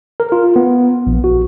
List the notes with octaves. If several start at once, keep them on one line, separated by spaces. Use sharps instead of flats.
A#4
F4
B3
A#1
F#4